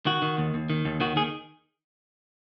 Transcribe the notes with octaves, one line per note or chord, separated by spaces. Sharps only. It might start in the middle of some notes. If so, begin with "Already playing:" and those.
D#3 F#4
D#3
D#2
D#2
D#3
D#2
D#3 F#4
D#3 G#4